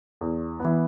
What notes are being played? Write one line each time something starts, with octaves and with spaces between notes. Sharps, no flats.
E2
E3 B3